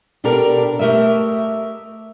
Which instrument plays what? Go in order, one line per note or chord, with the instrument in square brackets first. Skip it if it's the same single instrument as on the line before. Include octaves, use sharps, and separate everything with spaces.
[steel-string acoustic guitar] B2 D4 G4 A4 A#4
A3 G4 A#4 D#5 E5